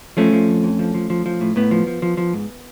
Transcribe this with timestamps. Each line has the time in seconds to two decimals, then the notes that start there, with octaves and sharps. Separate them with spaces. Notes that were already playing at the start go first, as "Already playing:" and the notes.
0.17 F3 A3 C#4
0.32 F3
0.49 F2
0.64 F2
0.79 F3
0.94 F3
1.10 F3
1.26 F3
1.41 A2
1.56 A2 B3
1.71 F3
1.87 F3
2.02 F3
2.17 F3
2.33 G#2